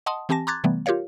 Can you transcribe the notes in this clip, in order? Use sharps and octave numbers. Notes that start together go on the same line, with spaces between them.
D#5 F#5 A5 C6 D#6
E3 C4 G4 G#5 A5 A#6
A#5 C6 D6 F#6 G#6 A6
C3 E3 G3 A3 B3
F4 G4 A#4 C#5 F5